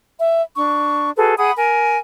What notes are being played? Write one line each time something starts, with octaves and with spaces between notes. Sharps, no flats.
E5
D4 C#6
F#4 G#4 A4 B4
G#4 F#5 B5 D#6
A#4 G#5